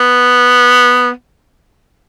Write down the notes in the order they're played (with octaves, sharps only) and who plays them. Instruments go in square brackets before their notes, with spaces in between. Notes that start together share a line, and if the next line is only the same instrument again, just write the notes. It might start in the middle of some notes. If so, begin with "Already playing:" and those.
Already playing: [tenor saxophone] B3